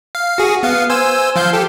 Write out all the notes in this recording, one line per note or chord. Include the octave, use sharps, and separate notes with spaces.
F5
F#4 G#4
B3 F5
C5 G#5 E6
F3 F5 G6
G4 A4